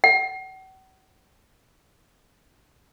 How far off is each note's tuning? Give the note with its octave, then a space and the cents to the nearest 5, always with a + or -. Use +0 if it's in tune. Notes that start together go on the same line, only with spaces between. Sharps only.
F#5 +45